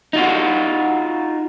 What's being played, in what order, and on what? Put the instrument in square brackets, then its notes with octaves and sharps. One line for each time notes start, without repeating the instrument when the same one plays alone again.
[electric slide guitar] D#4 F4 F#4